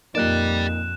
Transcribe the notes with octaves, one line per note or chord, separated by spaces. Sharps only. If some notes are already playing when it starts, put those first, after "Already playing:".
F2 A#2 A#3 D#4 G4 D5 F#6 E7